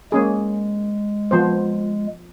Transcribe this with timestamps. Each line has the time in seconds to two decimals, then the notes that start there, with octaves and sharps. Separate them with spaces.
0.12 G#3 A#3 C#4 G#4
1.31 F3 B3 C5